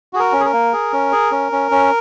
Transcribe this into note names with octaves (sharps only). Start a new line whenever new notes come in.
F#4 G#4
A#4
C#4
G#4
A#4
A#3
G#4
C#4
G#4
C#4
C#4
C#4